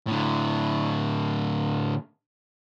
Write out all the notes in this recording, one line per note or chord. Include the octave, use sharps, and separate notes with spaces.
A2 D3